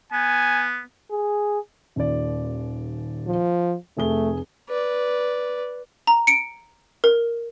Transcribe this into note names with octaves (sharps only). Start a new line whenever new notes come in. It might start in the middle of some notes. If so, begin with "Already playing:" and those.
B3 G#5
G#4
D#1 D#2 D5
F3
F1 A3 G#4 G7
B4 D5
A#5
C#7 D7
A#4